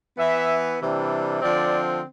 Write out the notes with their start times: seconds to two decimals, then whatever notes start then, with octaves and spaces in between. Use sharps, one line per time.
0.16 E3 B3 E4 E5
0.79 C3 E3 G3 D4
1.41 D3 F3 C4 D5